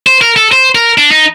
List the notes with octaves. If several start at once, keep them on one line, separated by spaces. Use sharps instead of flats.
C5
A#4
A4
C5
A#4
D4
D#4